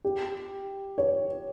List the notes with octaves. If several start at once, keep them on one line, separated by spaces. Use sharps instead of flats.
G4
C#5